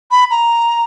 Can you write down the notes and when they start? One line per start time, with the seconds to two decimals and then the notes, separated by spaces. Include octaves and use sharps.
0.11 B5
0.31 A#5